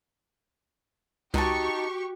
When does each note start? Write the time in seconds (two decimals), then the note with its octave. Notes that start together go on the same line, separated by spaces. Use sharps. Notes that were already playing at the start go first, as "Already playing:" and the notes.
1.34 C#2 D#4 F#4 G4 A5 C#6